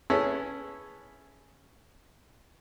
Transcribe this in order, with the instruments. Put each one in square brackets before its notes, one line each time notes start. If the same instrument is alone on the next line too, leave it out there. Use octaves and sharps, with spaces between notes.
[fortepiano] B3 C#4 E4 G#4 A4